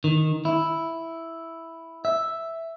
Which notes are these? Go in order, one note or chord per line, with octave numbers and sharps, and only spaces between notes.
D#3
E4
E5